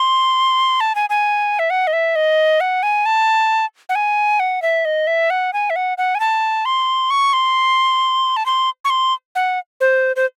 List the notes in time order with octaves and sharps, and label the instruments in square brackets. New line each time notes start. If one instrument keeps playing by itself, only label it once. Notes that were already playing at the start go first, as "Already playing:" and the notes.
Already playing: [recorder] C6
A5
G#5
G#5
E5
F#5
D#5
E5
D#5
F#5
G#5
A5
F#5
G#5
F#5
E5
D#5
E5
F#5
G#5
E5
F#5
F#5
G#5
A5
C6
C#6
C6
A5
C6
C#6
C6
F#5
C5
C5